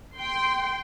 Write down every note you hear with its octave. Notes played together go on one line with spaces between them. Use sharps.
G5 C6